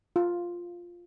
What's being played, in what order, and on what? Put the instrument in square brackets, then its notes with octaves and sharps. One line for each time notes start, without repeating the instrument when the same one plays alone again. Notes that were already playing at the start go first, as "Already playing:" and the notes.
[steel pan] F4